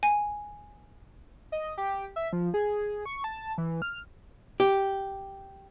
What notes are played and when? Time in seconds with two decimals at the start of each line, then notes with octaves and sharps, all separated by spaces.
0.03 G#5
1.52 D#5
1.78 G4
2.16 E5
2.33 F3
2.54 G#4
3.05 C#6
3.24 A5
3.58 E3
3.82 F6
4.60 G4